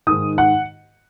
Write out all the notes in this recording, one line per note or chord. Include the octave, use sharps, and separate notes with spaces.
G#2 D#3 D#6
F#5